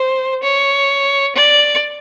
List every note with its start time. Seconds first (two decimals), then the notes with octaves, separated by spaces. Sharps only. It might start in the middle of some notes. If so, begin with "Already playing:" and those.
Already playing: C5
0.43 C#5
1.36 D5